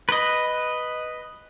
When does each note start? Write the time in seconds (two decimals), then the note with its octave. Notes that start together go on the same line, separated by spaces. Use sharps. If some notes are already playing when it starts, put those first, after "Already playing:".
0.09 B4 D#5